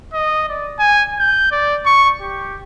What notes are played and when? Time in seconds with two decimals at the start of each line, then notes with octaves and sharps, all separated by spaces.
0.13 D#5
0.49 D5
0.79 G#5
1.19 G6
1.51 D5
1.86 C#6
2.21 G4